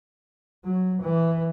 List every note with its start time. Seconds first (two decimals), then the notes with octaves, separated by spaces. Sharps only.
0.64 F#3
1.02 E3